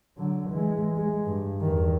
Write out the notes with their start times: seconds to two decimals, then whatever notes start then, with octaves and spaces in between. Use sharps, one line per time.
0.17 D3 F#3
0.50 E3 G#3
0.97 G#3
1.26 G2
1.60 E2 D#3